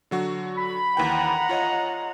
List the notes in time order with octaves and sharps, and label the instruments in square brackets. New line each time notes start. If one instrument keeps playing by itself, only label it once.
[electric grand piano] D3 F#3 F#4
[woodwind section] B5
[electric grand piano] D#2 E3 G5 [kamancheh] F#5 A#5
[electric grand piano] F4 C#5 D#5